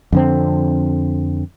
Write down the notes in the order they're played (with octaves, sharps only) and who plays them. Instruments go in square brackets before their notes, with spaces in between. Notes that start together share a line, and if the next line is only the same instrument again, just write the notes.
[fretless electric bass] F2 D3 C4